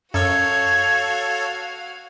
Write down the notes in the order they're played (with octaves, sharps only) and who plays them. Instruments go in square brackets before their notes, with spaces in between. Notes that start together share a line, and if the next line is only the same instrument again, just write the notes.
[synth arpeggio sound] F#2 E6 [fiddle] F#4 F5 [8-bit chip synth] A4 C#5 [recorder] G#6